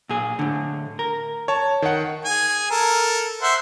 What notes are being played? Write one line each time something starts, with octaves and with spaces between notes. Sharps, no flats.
A#2 G#4
A2 D3
A#4
C#5 A5
D#3 F#5
G#4 G#5
A4 A#4
C5 E5 F#5